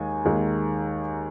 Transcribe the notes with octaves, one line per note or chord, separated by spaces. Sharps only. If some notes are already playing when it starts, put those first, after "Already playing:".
Already playing: D#2 D#3 G#3 G#5
D#2 D#3 G#3